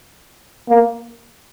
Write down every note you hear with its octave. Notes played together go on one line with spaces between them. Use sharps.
A#3